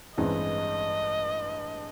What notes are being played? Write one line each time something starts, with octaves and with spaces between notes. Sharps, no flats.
A1 G2 E3 G#3 C4 D#5